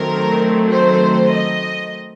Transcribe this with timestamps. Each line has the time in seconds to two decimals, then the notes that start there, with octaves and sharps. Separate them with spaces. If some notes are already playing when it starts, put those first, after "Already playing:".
Already playing: D#3 F#3 A3 C4 A#4
0.72 C5
1.32 D#5